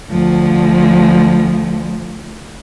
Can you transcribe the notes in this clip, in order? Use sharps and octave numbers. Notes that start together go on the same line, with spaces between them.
D2 F3